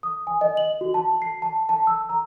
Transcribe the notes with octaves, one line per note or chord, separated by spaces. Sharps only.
D#6
G#5
D#5
F#7
F#4
A5
C7
A5
A5
E6
A#5